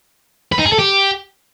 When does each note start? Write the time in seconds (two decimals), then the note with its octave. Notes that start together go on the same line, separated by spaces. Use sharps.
0.52 B4
0.59 D#4
0.65 G#4
0.72 A4
0.79 G4